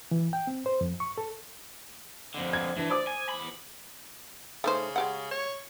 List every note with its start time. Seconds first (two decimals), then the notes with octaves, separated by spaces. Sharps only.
0.11 E3
0.33 G5
0.47 C4
0.66 C5
0.81 F2
1.00 C#6
1.18 A4
2.34 F2 D3
2.53 G#6
2.77 E3 D4
2.90 C5 D5 D6 D#6
3.07 G#5
3.29 E2 B5
4.64 C#3 A3 D#4 C5
4.96 G#3 G4 F#5
5.31 C#5